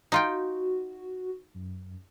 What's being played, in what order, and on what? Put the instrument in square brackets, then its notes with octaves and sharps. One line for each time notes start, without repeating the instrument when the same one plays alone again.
[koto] D#4 F4 G5 [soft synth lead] F#4
[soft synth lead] F#2